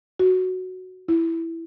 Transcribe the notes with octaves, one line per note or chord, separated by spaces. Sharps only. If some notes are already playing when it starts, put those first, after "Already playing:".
F#4
E4